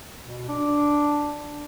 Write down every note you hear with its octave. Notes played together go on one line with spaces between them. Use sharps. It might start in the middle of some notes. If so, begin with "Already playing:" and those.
B2
D4